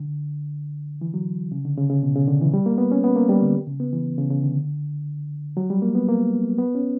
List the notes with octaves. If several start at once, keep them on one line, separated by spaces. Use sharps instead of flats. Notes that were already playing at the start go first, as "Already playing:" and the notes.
Already playing: D3
E3
F#3
C#3
D3
C#3
C#3
B2
C#3
D3
E3
G3
A#3
B3
C#4
B3
A#3
G3
D3
C#3
B3
E3
C#3
C#3
D3
F#3
G3
A#3
B3
A#3
B3
C#4